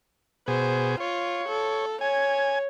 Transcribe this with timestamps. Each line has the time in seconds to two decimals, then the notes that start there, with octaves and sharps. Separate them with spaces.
0.48 B2 G#4 C5
1.00 F4 C#5
1.49 A4
2.01 C#5 G#5